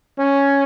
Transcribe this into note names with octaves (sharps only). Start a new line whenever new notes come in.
C#4